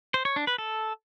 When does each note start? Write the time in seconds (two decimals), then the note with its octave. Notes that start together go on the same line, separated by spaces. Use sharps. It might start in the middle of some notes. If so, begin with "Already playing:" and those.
0.14 C5
0.25 C#5
0.36 D4
0.47 B4
0.58 A4